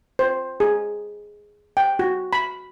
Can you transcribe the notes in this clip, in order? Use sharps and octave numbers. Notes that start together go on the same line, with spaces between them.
C5
G#4
G5
F#4
B5